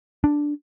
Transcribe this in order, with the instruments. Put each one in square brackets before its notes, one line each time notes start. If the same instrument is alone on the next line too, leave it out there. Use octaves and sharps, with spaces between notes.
[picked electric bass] D4